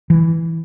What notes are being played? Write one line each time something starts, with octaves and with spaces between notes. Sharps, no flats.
E3